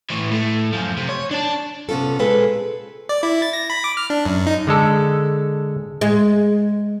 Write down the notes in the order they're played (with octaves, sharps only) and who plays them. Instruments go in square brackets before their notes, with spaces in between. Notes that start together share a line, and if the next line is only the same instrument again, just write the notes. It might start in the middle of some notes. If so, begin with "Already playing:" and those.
[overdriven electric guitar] A2 E3
A2 A3
F#2 F3
C3
C#5
D4 A5
[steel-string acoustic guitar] C3 B3 C#4 F4 A4
A#2 G#3 C4 G#4 A4 B4
[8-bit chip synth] D5
E4
A6
A#6
B5
D6
F6
D4
F#2
D#4
[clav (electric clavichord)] D3 G#3 A4
[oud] G#3